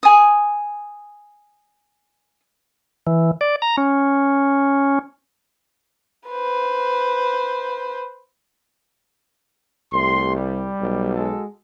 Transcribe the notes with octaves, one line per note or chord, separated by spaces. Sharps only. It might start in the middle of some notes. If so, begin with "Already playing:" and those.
G#5 D#6
E3
D5
A#5
C#4
B4 C5
C2 A3 G4 C6
G3
B1
G#3 F#4 A4